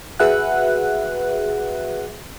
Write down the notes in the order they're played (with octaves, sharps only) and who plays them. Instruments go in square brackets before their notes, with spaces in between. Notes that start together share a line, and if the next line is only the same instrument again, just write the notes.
[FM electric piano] F#4 G#4 B4 E5 F#5 F#6